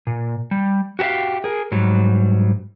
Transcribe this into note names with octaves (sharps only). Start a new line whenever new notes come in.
A#2
G3
F#4 G4 A4 E5 F5
G#4 A#4
G#2 F#3 G3